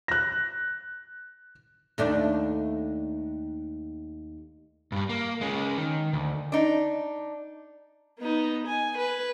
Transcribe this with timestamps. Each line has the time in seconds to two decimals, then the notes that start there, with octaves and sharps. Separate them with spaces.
0.08 F#6 A#6
1.98 D#2 A3 D4
4.92 G2 G3
5.09 A#3
5.41 G#3 C#4
5.78 D#3
6.13 D2
6.52 D4 D#4
8.19 B3 D#4
8.67 G#5
8.98 B4